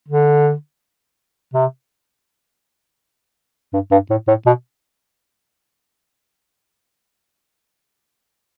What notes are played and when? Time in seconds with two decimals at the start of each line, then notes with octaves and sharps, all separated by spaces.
0.08 D3
1.54 C3
3.73 G2
3.91 G2
4.10 A2
4.28 A2
4.46 B2